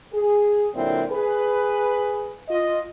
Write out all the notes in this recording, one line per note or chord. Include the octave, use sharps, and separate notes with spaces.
G#4
A#2 D3 F#3 C4 E4
G#4 B4
F4 D#5